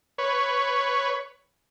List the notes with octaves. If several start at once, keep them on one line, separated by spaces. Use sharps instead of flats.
B4 C#5